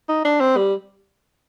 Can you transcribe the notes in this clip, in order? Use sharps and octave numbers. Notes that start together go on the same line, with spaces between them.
D#4
D4
C4
G3